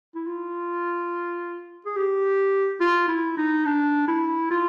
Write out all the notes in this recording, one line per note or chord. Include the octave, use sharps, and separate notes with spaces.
E4
F4
G#4
G4
F4
E4
D#4
D4
E4
F4